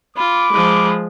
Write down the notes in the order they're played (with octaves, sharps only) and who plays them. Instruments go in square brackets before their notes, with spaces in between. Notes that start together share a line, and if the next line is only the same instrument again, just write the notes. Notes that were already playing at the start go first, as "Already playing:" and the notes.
[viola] F4 [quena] B5 [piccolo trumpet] D6
[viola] F3 G#3